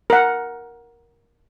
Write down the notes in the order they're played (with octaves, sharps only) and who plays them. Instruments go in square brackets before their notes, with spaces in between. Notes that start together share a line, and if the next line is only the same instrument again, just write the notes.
[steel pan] A#4 F#5